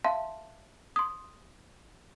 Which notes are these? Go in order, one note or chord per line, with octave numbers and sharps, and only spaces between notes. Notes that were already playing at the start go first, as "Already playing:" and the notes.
E5 F5 A5 C6
C6 D#6